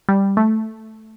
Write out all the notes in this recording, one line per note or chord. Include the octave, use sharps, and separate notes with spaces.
G3
A3